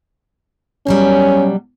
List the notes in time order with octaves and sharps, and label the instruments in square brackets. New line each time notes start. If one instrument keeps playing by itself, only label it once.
[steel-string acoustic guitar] B2 F#3 G3 [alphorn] C#4